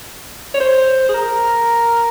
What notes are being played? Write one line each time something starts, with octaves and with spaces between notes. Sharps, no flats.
C#5
C5
G#4
A#4